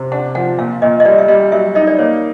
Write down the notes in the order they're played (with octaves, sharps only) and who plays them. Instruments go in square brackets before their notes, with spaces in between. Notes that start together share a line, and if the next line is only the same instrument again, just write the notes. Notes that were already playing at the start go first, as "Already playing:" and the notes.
Already playing: [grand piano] C3
[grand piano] D4 [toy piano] F#5
[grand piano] F3 [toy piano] F#5
[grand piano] A#2 [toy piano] F5
[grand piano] A#2 [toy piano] D#5
[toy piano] D#5
[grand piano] G3 [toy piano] D5
[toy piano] E5
[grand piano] G3 [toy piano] D#5
[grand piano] F#3 [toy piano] E5
[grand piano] D#4 [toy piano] D#5
[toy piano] D5
[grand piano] A#3 [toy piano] C#5